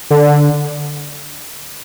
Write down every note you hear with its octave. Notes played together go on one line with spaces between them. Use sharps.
D3